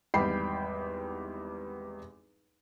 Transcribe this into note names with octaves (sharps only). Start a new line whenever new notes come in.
G#1 E2 G3 G5 B5 C7